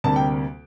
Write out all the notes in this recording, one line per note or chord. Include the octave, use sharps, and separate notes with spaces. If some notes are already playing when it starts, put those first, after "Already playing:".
D2 C3 G3 A#3 A5
G5